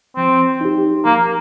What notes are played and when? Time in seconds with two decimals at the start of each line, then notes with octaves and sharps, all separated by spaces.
0.16 F3 C4
0.61 D#4 G4
1.05 F3 A#3